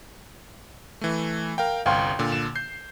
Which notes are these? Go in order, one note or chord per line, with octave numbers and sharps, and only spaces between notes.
E3 A3
A#4 F5 G5
G1 C2 F5 G5 C6
A#2 D3
E7
G6 C7